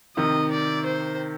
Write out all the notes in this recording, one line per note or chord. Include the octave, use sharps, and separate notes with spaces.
C3 D#3 D#5
D5
C5